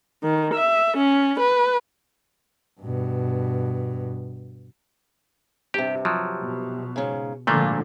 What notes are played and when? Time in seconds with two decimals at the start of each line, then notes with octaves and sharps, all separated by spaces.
0.23 D#3
0.54 E5
0.97 C#4
1.40 B4
2.81 G2 B2
5.74 G2 C3 G4
6.05 F3 F#3
6.40 B2
6.96 G#2 C#3
7.47 G#1 A#2 D3 F3 A3 A#3 F4